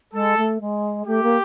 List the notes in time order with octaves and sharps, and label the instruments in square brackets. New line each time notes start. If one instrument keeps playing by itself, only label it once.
[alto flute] G#3 [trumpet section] A4
[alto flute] A3
G#3
[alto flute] A3 [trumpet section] G4
[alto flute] A#3